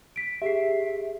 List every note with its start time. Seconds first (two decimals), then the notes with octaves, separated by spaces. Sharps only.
0.16 B6 D7
0.42 G4 G#4 E5 C7